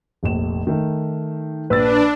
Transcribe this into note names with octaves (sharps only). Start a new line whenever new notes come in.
F1 A#1 E7
D#3 A3
A#1 D4 B4 E6 A6